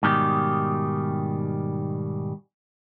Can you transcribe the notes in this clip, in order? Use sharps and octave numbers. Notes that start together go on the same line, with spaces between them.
G#2 B2 D#3 G3 G4